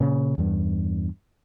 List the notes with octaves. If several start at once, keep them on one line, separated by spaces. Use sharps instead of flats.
A#2 C#3 C#4
E2 G2